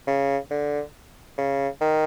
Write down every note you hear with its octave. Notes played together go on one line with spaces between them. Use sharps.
C#3
D3
C#3
D#3